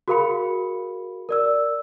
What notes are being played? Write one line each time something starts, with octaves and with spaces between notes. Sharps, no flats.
F#4 G#4 A#4 F5 B5 C#7
A#4 D5 E6